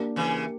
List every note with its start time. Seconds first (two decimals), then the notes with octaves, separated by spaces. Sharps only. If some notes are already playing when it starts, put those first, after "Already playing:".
Already playing: A#3 D4 G4 A#4
0.16 C#3 E3